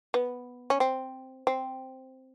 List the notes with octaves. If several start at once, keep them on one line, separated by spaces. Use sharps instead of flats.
B3
C#4
C4
C4